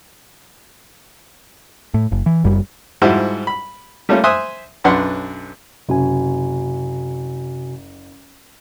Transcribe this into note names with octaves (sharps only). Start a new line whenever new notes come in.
A2
F#1
E3
F#1 F#2 G3
G#2 F3 G3 E4 F#4
B5
G3 A3 A#3 C#4 F4
C5 E5 G#5 C6 D#6 F#6
B1 F#2 D4 B4 F#5 C6
F#1 C3 F#4 G#5